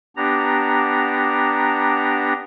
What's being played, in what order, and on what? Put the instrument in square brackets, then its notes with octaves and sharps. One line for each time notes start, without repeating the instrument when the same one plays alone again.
[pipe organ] B3 D4 G4 A#5